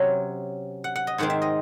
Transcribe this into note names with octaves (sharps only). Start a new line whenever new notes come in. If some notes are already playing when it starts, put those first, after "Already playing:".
Already playing: C3 F#3 C#4
F#5
F#5
D#5
G#2 D#3 G#3 C4 F#5
E5
D#5